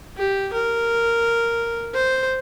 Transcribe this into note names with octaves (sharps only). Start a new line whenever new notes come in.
G4
A#4
C5